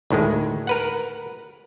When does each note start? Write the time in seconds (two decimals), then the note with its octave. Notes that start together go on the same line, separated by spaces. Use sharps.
0.10 D2 A2 D#3 G#3
0.67 A#4 B4 F#5